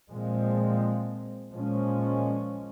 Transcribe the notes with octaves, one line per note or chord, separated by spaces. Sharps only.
A#2 F3 G#3 C4
A#2 F3 G#3 C#4